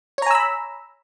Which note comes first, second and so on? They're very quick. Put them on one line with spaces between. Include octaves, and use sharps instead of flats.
C#5 A#5 G#5 E6 B5